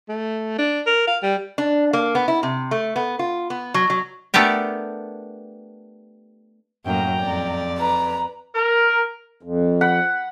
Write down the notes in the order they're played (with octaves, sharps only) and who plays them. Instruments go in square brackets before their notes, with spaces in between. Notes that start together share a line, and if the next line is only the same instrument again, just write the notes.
[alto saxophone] A3
D4
A#4
F5
G3
[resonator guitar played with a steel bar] D4
A#3
B3
E4
C3
A3
B3
F4
B3
F#3
F#3
[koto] A3 B3 D4 G4 A#4
[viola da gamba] F#2 A2 A#3 [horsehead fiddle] G5 A#5
[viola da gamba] F2 D5
[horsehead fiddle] B4 [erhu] A#5
[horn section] A#4
[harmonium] F2
[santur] F#5 B5